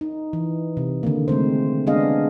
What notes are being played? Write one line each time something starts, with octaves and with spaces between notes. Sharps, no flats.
D#4
E3
C3
D3 D#3 A#3
G#3 A3 C4 C5
G#3 B3 D4 G#4 D#5 F5